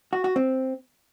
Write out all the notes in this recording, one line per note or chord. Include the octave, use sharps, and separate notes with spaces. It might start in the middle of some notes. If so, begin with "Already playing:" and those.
F#4
F#4
C4